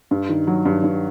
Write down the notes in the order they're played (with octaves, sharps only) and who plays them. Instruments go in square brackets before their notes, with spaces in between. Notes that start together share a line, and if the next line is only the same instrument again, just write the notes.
[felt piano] G2
D#3
F#3
G2
G2